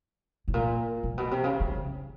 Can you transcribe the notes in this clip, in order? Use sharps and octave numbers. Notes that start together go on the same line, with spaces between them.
A2
A#2
A#2
B2
C3
C#3
D3
C#3